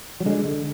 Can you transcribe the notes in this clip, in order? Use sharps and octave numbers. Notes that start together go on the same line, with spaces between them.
F#3
D3 G#3
D3